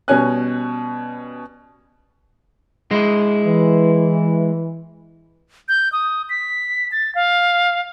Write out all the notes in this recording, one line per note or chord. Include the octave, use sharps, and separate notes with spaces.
B2 G3 C#4 G#5 F#6
G#3 E4
E3
G6
D#6
B6
A6
F5